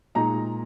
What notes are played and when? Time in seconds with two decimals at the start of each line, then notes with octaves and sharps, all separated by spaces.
0.15 A#2 G#3 D#4 A#5